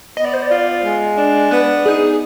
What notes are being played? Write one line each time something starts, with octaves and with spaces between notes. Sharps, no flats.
B3 D#5
D5
C5
D5
F4
G#3
D4
B3 B4
D#4 G#4